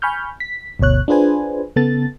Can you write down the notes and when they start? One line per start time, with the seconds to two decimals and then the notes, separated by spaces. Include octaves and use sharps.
0.02 G#5 B5 C#6 F6 G6
0.40 B6
0.79 G1 D2 B2 C#5 F#6
1.08 D4 F4 G#4 B4 C5 G#5
1.76 C#3 B3 A4 A6